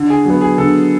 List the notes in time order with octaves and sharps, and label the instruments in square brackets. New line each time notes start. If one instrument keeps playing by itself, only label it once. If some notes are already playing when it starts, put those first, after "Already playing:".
Already playing: [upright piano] D3
[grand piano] G#4
[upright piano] F#3 B3 [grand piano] G#4
[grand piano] G#4
[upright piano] D3 [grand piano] A4